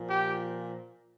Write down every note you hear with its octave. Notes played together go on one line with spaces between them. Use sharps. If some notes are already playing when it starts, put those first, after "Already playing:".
Already playing: A#2 F3
G4